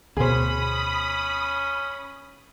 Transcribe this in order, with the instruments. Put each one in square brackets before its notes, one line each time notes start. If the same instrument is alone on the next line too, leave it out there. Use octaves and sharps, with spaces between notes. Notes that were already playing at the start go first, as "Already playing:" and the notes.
[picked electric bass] D2 B2 [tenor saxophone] C#4 [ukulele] G#4 C5 [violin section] B5 D#6